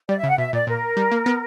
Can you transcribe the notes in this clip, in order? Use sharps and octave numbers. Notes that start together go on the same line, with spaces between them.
G3 D5
E5
C#3
F#5
B2 E5
A#2 D5
A#2 A#4
G3
A#3
B3